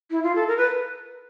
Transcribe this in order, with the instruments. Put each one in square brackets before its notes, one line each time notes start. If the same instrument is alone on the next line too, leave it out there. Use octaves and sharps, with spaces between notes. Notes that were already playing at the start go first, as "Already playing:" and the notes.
[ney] E4
F4
A4
A#4
B4